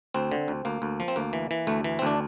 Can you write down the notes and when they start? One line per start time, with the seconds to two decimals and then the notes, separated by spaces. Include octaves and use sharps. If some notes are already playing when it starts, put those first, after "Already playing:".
0.14 D2 C4
0.31 D3
0.48 D2
0.65 D2 A#3
0.82 D2
1.00 F3
1.08 C4
1.16 D2 A#3
1.33 E3
1.51 E3
1.67 D2 A3
1.84 E3
1.99 C4
2.02 D2 D4